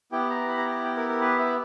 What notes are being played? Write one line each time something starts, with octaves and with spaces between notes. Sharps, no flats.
B3 E4 G4 G5
A#5
B5
A#5
G5
G5
A#4
A#4
B4
E5